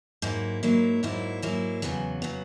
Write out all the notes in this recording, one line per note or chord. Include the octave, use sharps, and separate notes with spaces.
G#2 F#3 A#3 E4
G#2 F#3 A#3 E4
G#2 F#3 A#3 E4
G#2 F#3 A#3 E4
E2 C#3 F#3 B3
C#3 F#3 B3